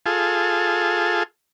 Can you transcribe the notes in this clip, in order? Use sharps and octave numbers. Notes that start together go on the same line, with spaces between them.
F4 G#4 A4